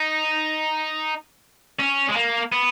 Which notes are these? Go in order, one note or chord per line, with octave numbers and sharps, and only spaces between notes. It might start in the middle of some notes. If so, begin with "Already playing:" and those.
Already playing: D#4
C#4
G#3
A#3
B3